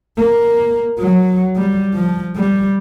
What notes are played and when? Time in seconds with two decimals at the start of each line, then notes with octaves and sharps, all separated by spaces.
0.17 A#3
0.99 F#3
1.56 G3
1.94 F3
2.36 G3